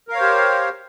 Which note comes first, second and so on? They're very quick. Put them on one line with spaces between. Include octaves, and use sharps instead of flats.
A#4 F5 C#5 C5 G4